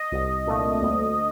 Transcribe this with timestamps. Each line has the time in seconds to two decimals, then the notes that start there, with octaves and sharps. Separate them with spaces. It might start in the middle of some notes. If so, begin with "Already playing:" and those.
Already playing: D#5
0.12 C2
0.47 A#2 A3 D4
0.82 D2